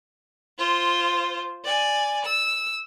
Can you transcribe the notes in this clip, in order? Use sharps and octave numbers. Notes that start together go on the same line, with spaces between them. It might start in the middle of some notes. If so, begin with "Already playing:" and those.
F4 C5
D5 G#5
E6